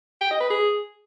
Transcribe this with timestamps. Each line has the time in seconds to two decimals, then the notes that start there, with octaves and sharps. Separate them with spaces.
0.21 G5
0.31 D#5
0.40 B4
0.50 G#4